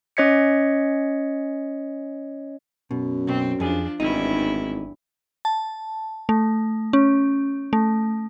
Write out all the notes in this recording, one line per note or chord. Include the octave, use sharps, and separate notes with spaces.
C#4 C#5 D#5 G#6 B6 C#7
F#2 B2
B1 B2 C4
F2 F3 D4 G#4
G#1 E2 G2 D#4 E4
A5
A3
C#4
A3